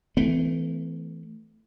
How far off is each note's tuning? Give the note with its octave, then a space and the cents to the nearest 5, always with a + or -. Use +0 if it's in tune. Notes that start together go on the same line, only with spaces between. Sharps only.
E3 -5 A3 +0 C4 -45